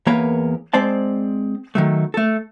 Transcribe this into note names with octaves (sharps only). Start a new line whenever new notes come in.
E2 A#3 A#4 B4 C#5
G#3 C4 C5 D5 A5
D#3 F#3 A3
A3 A4